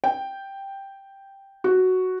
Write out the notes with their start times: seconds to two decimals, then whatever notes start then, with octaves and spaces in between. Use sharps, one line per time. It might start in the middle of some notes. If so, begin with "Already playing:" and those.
0.04 G5
1.64 F#4